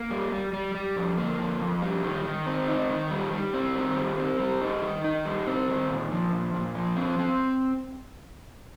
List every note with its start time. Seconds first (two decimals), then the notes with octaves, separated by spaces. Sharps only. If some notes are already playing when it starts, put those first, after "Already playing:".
Already playing: A#3
0.10 G3
0.32 G3
0.53 G3
0.75 G3
0.96 F2
1.17 A#3
1.39 F2
1.61 F2
1.82 G3
2.03 D#3
2.25 D#3
2.46 C4
2.68 D#4
2.89 D#3
3.11 G3
3.33 G3
3.54 C4
3.75 D#3
3.97 G3
4.18 C4
4.40 G3
4.61 D#4
4.82 D#3
5.04 D#4
5.25 G3
5.47 C4
5.68 D#3
5.89 A#2
6.11 F3
6.33 A#2
6.54 A#2
6.75 F3
6.96 C4
7.19 C4